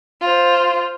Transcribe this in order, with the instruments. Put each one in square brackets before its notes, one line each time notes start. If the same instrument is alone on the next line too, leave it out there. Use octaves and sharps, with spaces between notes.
[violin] F4 C5